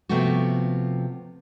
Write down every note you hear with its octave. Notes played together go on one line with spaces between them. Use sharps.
C3 F3 A3 B3 F#4